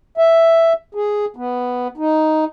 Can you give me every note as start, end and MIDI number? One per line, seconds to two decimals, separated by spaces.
0.18 0.73 76
0.95 1.25 68
1.36 1.88 59
1.97 2.45 63